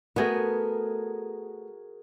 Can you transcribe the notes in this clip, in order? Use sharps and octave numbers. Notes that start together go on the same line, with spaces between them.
A3 B3 F#4 G#4 A#4